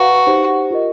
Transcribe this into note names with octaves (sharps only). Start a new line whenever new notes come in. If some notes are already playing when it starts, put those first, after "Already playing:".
Already playing: F#4 B4 D5 F5 A#5
D#4 G4 C5
F4 A#4 D#5